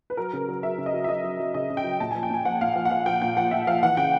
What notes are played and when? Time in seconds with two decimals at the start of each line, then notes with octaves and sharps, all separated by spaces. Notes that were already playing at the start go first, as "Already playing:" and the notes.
0.10 B4
0.17 F#3 A#4
0.33 C#3
0.48 F#3
0.63 F#3 E5
0.78 C#3
0.86 D#5
0.94 F#3
1.04 E5
1.08 F#3 D#5
1.24 F#3
1.40 F#3
1.54 C#3 D#5
1.70 C#3
1.77 G5
1.84 F#3
2.00 A#2 A5
2.11 F3 G#5
2.23 G5
2.30 A#2 G#5
2.45 F3 F#5
2.61 A#2 F5
2.76 F3
2.85 F#5
2.90 F3 F5
3.06 F3 G5
3.22 A#2 G5
3.37 F3 F#5
3.51 A#2 E5
3.67 F3 F5
3.83 E3 F#5
3.97 C#3 G5